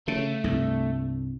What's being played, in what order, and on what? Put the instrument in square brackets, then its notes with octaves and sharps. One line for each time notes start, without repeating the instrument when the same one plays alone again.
[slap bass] C#3 [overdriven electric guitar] A3
[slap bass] C2 G2